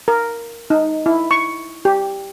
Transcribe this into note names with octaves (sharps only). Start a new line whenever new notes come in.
A#4
D#4
E4
C#6
G4